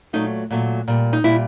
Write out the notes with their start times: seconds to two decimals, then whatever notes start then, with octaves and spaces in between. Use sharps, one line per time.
0.13 A#2 F#3 A3 D#4
0.51 A#2 F#3 A3
0.88 A#2 G3
1.13 D#4
1.24 A#2 G3 E4